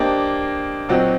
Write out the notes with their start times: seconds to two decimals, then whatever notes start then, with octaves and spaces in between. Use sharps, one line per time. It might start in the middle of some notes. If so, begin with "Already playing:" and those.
Already playing: A#3 D4 G4 C5 D#5
0.89 A#2 F#3 C4 D#4 F#4